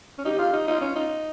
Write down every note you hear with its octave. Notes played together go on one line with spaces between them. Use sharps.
C#4
D#4 G4
F4
D#4
D#4 F4
C#4
D#4